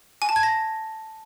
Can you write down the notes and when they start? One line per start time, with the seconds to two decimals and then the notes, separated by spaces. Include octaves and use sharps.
0.22 G#5
0.29 A5
0.36 G#6
0.43 A#6